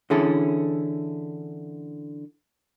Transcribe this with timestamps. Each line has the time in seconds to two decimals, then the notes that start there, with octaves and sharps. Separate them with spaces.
0.10 D3 E3 C#4 E4 G#4 A4